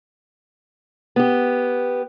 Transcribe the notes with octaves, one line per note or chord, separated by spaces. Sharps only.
B3 G4